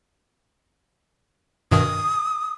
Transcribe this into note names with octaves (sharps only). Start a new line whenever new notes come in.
G2 B2 D#3 D#6